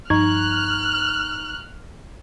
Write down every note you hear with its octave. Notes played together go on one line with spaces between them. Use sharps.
G2 F3 D#4 A#5 C#6 F6 F#6 G#6